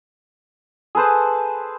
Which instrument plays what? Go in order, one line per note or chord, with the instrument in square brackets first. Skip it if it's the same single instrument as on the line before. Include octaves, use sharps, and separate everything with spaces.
[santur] G#4 A4 B4 C5